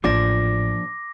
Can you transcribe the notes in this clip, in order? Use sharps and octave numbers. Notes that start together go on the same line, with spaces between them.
A1 A#2 F3 D4 D6 A#6